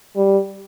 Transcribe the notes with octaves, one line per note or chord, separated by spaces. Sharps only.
G3